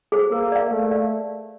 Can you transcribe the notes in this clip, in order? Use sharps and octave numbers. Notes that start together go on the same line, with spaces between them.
G#4 C5
A#3 A#4
D5 F5
A3 A#4
D5 F5